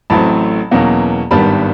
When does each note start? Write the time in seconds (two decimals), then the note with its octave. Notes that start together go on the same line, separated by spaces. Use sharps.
0.10 A1 A2 F#3 A3 C4 A5 B5
0.71 E2 B2 F#3 A#3 C#4
1.31 G#1 G2 D#3 G3 B3 A5 B5